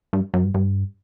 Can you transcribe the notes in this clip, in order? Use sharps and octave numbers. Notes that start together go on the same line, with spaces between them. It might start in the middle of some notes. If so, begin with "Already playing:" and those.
G2
F#2
G2
G2